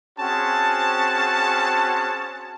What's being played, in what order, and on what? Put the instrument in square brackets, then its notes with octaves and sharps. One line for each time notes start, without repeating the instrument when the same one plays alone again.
[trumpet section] C4 C#4 F#4 G#4 A5